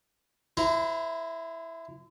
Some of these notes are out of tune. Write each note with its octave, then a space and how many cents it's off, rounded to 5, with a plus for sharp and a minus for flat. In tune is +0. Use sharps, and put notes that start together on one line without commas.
E4 +0 C5 -40 A#5 +0